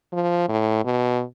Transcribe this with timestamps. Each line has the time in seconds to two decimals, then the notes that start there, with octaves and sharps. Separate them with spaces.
0.13 F3
0.49 A2
0.85 B2